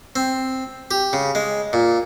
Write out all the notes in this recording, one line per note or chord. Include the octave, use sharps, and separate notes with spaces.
C4
G4
C#3
G#3
A#2